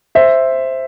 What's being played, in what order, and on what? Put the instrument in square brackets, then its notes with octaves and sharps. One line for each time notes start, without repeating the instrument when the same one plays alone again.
[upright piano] C5 E5